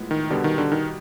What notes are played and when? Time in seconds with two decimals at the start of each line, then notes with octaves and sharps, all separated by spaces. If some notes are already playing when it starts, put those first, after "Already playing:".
Already playing: A2 F3 G#3 B3
0.11 D#3
0.30 B2 D3 G3 B3
0.44 D#3
0.58 D3
0.72 D#3